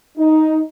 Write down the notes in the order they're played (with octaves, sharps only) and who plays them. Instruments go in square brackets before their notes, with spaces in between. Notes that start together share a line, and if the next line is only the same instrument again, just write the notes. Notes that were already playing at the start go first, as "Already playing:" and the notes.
[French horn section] D#4